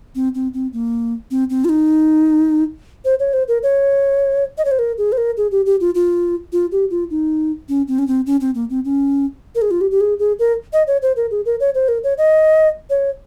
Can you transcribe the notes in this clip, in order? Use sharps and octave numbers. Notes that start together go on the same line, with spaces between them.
C4
C4
C4
A#3
C4
C4
F4
D#4
C5
C#5
C5
A#4
C#5
D#5
C#5
C5
A#4
G#4
C5
A#4
G#4
G4
G4
F4
F4
F4
G4
F4
D#4
C#4
C4
C#4
C4
C#4
C4
A#3
C4
C#4
A#4
G#4
F4
G4
G4
G#4
G#4
A#4
D#5
C#5
C5
A#4
G#4
A#4
C#5
C5
A#4
C#5
D#5
C#5